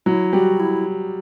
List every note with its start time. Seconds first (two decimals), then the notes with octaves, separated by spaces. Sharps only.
0.06 F#3 E4
0.33 G3 F#4
0.60 E4